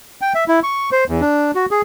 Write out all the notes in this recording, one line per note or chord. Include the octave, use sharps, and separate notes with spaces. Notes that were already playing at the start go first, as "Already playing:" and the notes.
G5
E5
E4
C#6
C5
E2
D4
F#4
G#4